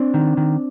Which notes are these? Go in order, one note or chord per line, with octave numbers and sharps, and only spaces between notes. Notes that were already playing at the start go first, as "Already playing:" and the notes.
Already playing: C4 D4
D#3
D#3